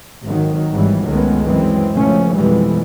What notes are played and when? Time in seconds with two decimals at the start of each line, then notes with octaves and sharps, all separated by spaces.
0.24 G#1 D#3 F#3
0.70 G#1 G#2 E3 F#3 G3
1.05 C#2 F#2 D#3 G#3 A3 B3
1.44 F#2 E3 G#3 C4
1.93 C#2 F3 A3 C#4
2.35 F2 B2 E3 G3 G#3